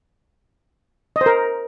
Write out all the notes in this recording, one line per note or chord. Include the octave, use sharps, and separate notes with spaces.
D#5
C5
A#4